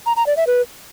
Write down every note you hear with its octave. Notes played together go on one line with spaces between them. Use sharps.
A#5
A#5
D5
E5
B4